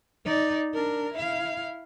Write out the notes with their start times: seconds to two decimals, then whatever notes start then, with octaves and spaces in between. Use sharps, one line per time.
0.25 D#4 D5
0.74 D4 A#4
1.13 E4 F5